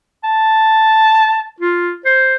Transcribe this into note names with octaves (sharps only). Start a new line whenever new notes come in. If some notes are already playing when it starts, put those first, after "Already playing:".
A5
F4
C5